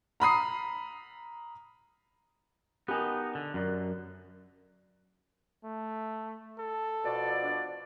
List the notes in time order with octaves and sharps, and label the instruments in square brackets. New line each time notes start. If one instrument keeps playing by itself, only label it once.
[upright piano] A#5 B5 D#6 C7
[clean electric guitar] B3 D#4 [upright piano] G4 A#4 G#5
[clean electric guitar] D3
[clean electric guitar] F#2 [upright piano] A#4 D5 F#6
[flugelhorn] A3
A4
[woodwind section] B2 F3 D5
[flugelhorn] D4